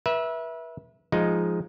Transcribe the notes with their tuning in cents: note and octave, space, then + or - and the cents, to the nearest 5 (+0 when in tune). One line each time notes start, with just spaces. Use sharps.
B4 -35 E5 -10
F3 +0 G#3 +0 D#4 +0